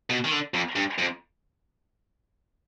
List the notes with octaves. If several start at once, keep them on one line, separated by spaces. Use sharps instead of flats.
B2
D#3
D3
F2
G2
F2